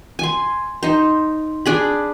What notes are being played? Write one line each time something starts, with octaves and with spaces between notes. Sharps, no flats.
G#5 C6
D#4 C5
D4 G#4 B5